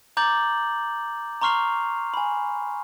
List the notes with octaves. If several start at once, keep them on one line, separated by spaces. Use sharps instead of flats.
A#5 D6 G6 A6 F#7
A#5 C6 C#6 F6 C7 F7
G#5 B5